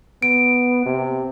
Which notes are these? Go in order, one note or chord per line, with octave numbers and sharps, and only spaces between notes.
B3 D7
C3